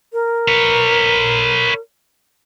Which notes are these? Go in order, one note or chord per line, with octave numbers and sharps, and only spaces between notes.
A#4
B4 C#5